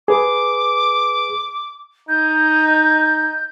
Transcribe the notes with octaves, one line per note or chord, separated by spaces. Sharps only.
G#4 B4 D6
D#4 G6